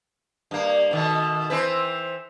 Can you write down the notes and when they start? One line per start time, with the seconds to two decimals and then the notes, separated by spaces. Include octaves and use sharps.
0.51 G2 A#3
0.91 B2 D#3 A3
1.50 E3 C4 B4